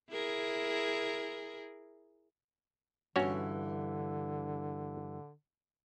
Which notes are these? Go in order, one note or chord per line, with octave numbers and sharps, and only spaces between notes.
E4 G#4 A#4
G2 D3 E3 C#4 F#4 C#5